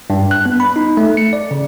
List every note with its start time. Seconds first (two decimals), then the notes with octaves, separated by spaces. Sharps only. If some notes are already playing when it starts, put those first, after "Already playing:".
0.10 G2
0.31 F#6
0.46 B3
0.60 B5
0.76 D#4
0.97 A3
1.17 C#7
1.33 D5
1.51 C#3